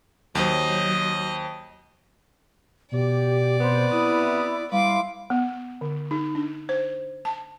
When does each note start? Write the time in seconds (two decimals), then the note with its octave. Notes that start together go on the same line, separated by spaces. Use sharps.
0.35 D#2 F#3 C5 D#5
2.92 B2 G4 D5
3.61 C3 B3 C5 C6
3.92 E4 D#6
4.72 G3 E4 B4 F5 C6 D6
5.30 B3
5.81 D3
6.11 D#4
6.35 D4
6.69 C5
7.25 A5